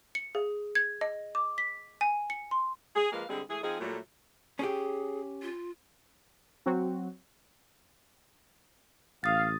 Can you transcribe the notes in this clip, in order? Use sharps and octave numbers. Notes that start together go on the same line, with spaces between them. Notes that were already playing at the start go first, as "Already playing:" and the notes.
C#7
G#4
G#6
D#5
D6
B6
G#5
C#7
C6
G#4
F3 G#3 A#3 B4 F5
D3 G3 G#3 C4 G#4
E3 A3 G#4
F3 C4 D#4 G#4
A#2 F#3 G3 A3
C#4 G4 G#4
F4
F#3 C4 F#4
A1 F5 D#6 A6